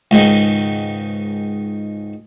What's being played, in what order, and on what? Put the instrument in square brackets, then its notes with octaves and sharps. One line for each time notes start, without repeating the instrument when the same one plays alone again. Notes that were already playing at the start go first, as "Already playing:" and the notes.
[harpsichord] C#2 G#2 D#3